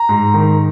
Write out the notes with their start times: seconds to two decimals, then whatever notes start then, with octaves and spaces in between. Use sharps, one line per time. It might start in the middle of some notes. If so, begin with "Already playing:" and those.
Already playing: A#5
0.09 G#2
0.34 D#3